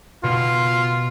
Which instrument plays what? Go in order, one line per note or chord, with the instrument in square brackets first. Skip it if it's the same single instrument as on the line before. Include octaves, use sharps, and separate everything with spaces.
[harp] B2 [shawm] F4